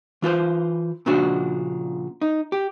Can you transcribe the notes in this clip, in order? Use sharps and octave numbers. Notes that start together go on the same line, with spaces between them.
E3 F4 B4 C5
A#2 C#3 F3 D4 F#4
D#4
G4